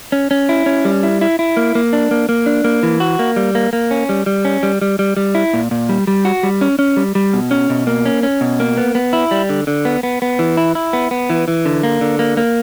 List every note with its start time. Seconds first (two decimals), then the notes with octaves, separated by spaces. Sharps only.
0.12 C#4
0.31 C#4
0.49 E4
0.66 C#4
0.85 G3
1.03 E4
1.21 E4
1.39 E4
1.57 A#3
1.75 A#3
1.93 D4
2.11 A#3
2.29 A#3
2.46 D4
2.64 A#3
2.83 E3
3.00 F#4
3.19 A#3
3.36 G3
3.55 A#3
3.73 A#3
3.91 C#4
4.09 G3
4.26 G3
4.45 C#4
4.63 G3
4.82 G3
4.99 G3
5.17 G3
5.35 E4
5.54 A#2
5.71 A#2
5.89 G3
6.07 G3
6.25 F#4
6.43 G3
6.61 C#4
6.79 C#4
6.97 G3
7.15 G3
7.34 B2
7.51 C#4
7.70 B2
7.87 A#3
8.06 C#4
8.23 C#4
8.41 B2
8.60 A#3
8.78 B3
8.95 B3
9.13 E4
9.31 G3
9.49 D3
9.67 D3
9.85 B3
10.03 B3
10.22 B3
10.39 E3
10.57 E4
10.75 E4
10.93 B3
11.11 B3
11.30 E3
11.48 E3
11.65 D3
11.83 A#3
12.01 D3
12.19 A#3
12.37 A#3